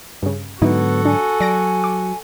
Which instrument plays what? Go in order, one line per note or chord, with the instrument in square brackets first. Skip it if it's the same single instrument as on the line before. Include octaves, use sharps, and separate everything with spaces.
[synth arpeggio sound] G2 C#3
[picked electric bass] G#2 D3 F#3 [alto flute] B3 [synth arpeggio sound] D#4 E4 [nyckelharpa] F#4 A4
[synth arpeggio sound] D4 [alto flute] G#5
[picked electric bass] F#3 [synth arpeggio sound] D5 A#6 D7
[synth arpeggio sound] D6